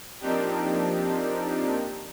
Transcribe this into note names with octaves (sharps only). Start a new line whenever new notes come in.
F3 A#3 C4 D4 D#4 G4